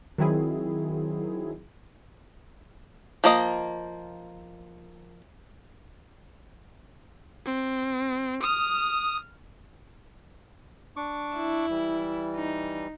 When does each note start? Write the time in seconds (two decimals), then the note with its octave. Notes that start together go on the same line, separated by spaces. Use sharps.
0.18 D#3 F#3 C4 E4 G#4
3.24 F3 A#3 D#5
7.46 C4
8.44 D#6 F6
10.96 D4 C#6 D6
11.37 E4
11.70 E3 G3
12.36 D#4